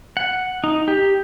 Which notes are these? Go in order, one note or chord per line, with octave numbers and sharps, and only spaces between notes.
F#5
D#4
G4